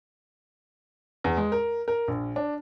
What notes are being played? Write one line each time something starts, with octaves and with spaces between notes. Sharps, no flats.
E2
G#3
A#4
A#4
A#1
D4